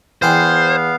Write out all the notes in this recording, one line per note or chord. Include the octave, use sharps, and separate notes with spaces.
E2 B3 G#4 C5 F5 G5